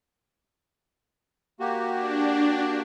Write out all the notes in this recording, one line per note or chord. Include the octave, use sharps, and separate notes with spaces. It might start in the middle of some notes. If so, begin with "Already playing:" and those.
A#3 F#4 G4
D4